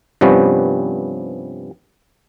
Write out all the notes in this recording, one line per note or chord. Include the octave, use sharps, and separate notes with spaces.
G2 C3 F3 G3 B3 C#4